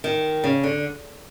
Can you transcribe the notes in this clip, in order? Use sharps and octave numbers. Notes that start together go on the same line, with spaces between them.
D#3
C#3
D3